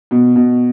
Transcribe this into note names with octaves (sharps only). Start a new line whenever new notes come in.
B2
B2